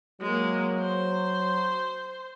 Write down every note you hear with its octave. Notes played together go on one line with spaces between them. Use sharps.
F#3 G#3 A#3
C5